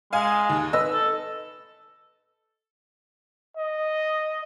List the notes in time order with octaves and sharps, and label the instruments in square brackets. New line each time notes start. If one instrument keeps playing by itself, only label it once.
[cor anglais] G#3 [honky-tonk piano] F5 G#5
[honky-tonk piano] D#2
[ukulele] B4 D#5 [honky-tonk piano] E6
[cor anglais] A4
[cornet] D#5